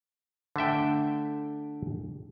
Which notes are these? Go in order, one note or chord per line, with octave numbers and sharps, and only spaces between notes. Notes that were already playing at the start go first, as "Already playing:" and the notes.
D3 A3 E5 G5